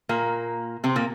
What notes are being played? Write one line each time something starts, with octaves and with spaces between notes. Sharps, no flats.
A#2 A#3
C3 C4
A#2 A#3